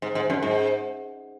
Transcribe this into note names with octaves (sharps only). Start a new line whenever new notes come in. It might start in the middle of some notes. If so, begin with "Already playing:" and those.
G#2
G#2
F#2
G#2